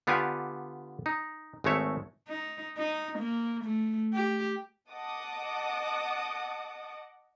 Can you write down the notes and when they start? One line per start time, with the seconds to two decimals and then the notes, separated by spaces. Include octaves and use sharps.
0.07 D3 B3 F4 G4 D5 G#5
1.06 D#4
1.64 G#1 G#3 A3 C#5 E5
2.28 D#4
2.78 D#4
3.19 A#3
3.64 A3
4.14 G4
4.90 D#5 F#5 A5 D6 D#6